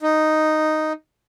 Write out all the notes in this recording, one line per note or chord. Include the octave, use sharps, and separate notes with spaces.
D#4